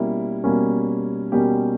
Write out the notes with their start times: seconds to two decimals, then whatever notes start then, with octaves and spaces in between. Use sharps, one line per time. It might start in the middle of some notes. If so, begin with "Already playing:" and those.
Already playing: B2 G3 A#3 C#4 E4
0.44 B2 G3 A#3 C#4
1.32 B2 G3 A#3 C#4 G4 G5